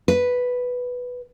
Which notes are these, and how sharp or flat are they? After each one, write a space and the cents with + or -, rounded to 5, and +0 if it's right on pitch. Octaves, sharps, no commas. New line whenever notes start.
B4 +0